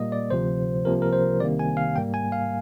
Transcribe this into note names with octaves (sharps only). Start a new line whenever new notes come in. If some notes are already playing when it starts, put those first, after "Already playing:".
Already playing: A#2 G3 A#3 D#5
D5
D2 C3 F3 C5
C2 C3 F3 A#3 A#4
A#4
C5
C2 C3 D#3 A#3 D5
G#5
F5
G#2 G3 A#3 G5
G#5
F5